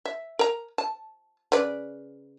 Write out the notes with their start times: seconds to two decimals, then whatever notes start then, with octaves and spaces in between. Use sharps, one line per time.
0.05 E5
0.39 A#4 A#5
0.78 A5
1.52 C#3 B4 D5